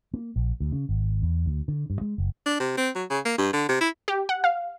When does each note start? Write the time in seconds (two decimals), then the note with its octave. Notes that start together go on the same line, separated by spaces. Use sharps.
0.14 A#3
0.36 A#1
0.60 D2
0.72 C#3
0.89 G#1
1.22 E2
1.46 D2
1.68 D3
1.90 G2
2.01 G#3
2.18 F#1
2.46 D4
2.60 C3
2.78 C4
2.95 F#3
3.10 C#3
3.25 A#3
3.38 G2
3.53 D3
3.69 C3
3.81 E4
4.08 G4
4.29 F#5
4.44 F5